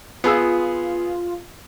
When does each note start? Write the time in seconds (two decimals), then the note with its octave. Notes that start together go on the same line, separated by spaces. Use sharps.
0.24 B3 F4 G#4 E6